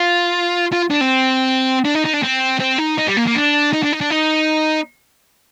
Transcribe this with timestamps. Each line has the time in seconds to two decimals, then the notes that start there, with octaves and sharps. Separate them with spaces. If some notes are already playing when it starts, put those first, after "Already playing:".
Already playing: F4
0.73 F4
0.91 D4
1.01 C4
1.85 D4
1.94 D#4
2.04 D#4
2.13 D4
2.23 C4
2.60 C4
2.78 D#4
2.98 D#4
3.07 G3
3.17 A#3
3.27 A#3
3.35 D4
3.73 D#4
3.83 D4
3.93 D#4
4.01 D4
4.10 D#4